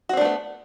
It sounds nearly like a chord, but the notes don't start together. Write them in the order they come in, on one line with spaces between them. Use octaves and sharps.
F#4 C4 D4 A3 B3